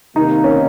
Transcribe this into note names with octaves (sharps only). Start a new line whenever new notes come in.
C3 D#3 A#3 D#4
C#4